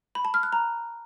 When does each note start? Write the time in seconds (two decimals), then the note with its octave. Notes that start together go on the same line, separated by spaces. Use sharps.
0.15 B5
0.25 A5
0.34 F6
0.43 F#6
0.53 A#5